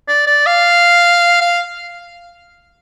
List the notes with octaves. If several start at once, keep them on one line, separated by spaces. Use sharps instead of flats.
D5
D5
F5
F5